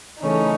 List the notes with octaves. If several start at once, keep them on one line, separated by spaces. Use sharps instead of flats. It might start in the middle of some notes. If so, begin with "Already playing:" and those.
C#3 E3 A3 C#4 D#4